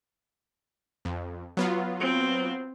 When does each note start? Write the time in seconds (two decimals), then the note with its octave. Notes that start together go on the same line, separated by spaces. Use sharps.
1.05 F2
1.57 F#3 B3 F4
2.00 C4